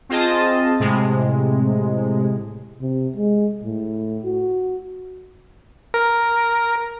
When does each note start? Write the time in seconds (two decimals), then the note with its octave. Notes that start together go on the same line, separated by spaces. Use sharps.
0.09 C4 F4 G#4 D#5 A5
0.80 A2 C3 G#3
2.81 C3
3.16 G#3
3.63 A2
4.25 F#4
5.94 A#4